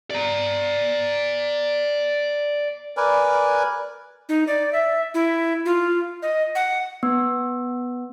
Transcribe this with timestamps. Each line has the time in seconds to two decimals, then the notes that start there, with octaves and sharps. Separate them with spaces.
0.10 D5 A#5
2.97 A#4 B4 D5 G#5
4.29 D#4
4.47 D5
4.73 E5
5.14 E4
5.66 F4
6.22 D#5
6.55 F#5
7.03 B3